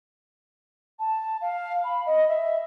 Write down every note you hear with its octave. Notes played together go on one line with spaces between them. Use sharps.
A5
F5
B5
D#5
E5